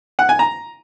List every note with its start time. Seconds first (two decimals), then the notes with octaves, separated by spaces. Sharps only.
0.19 F#5
0.29 G#5
0.39 A#5